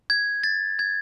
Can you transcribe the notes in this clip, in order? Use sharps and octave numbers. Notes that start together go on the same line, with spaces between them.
G#6
A6
G#6